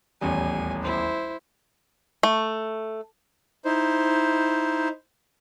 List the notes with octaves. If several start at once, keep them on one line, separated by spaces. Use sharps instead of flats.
D#1 A1 E2 G#5
E4 C5
A3
D#4 E4 C5